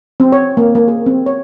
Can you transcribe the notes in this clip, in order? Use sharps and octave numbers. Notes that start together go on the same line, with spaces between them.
C4
C#5
A#3
A#3
G#4
C4
C#5